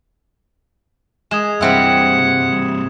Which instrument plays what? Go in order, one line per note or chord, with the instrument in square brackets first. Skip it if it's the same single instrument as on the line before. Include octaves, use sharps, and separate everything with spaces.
[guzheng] G#3 [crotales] D#6 G#6 E7
[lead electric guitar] C2 G2 [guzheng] G3 C4 E4 [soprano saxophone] F#5